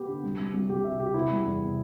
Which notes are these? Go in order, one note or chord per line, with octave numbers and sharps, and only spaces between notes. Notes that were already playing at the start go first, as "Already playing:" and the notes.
Already playing: B3 G4 B4
D3
G3
G3
C2
C2 G4
C3 E5
C3 G4
B3 E4
G3
E2
C3